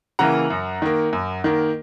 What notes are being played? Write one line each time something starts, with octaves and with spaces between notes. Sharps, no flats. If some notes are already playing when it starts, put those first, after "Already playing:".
C#3 E3 A#3 F#5 A#5
F#2
D#3 A#3
F#2
D#3 A#3